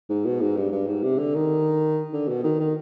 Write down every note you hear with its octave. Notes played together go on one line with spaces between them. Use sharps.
G#2
B2
G#2
G2
G2
G#2
C3
D3
D#3
D3
B2
D#3
D#3